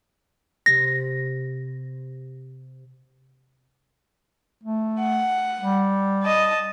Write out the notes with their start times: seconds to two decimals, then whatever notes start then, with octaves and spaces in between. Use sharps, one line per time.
0.66 C3 A#6
4.64 A3
5.00 F#5
5.61 G3
6.23 D#5 A5